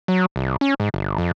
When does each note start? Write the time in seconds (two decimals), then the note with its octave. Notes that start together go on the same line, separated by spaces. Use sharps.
0.08 F#3
0.36 C2
0.61 C#4
0.80 G#2
0.94 G1
1.18 F2